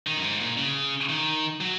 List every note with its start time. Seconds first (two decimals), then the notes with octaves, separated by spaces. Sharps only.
0.07 D#3
0.17 F#2
0.24 G#2
0.40 A#2
0.58 C#3
1.09 D#3
1.61 F#3